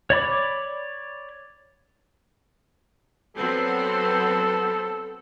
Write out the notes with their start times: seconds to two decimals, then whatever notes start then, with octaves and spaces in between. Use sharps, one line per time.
0.10 C#5 D5 B5 D6
3.37 F#3 B3 C4 A4